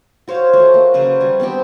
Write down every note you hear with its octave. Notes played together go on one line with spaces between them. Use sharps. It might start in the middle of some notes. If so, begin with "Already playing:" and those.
F#4 C5 C#5 F5
A3 F#4
A#3
C#3 F#3 B4 C5
G3 G#3
B3 C4 D4 G4